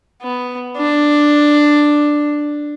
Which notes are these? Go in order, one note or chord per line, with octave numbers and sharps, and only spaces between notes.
B3
D4